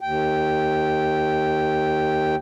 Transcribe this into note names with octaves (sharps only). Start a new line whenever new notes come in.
D#2 G5